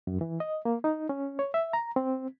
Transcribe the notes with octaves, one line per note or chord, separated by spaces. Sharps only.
F#2
E3
D#5
A#3
D#4
C#4
C#5
E5
A#5
C4